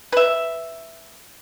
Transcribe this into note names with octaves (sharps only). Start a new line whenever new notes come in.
B4 E5